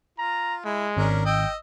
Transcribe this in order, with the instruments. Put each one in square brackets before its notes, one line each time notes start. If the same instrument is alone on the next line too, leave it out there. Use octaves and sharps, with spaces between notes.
[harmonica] F4 [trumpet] A#5
[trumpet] G#3 [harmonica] E4
[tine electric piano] G#1 [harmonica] C#4 D4 A#4
[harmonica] D#5 E6 [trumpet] G5